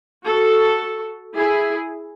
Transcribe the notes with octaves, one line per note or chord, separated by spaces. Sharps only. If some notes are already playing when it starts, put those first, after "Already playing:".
F#4 A4
E4 G#4